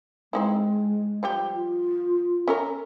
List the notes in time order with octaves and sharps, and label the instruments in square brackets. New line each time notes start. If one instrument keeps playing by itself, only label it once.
[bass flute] G#3 [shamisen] C4 D#4 E4
[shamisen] F3 G3 G4
[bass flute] F4
[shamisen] C#4 A4 A#4